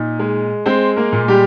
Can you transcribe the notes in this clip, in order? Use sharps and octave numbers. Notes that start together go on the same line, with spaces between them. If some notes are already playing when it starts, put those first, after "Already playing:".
Already playing: A#2 D#4
G#3
G#3 C4 C5
A#3 A#4
A#2
G3 G4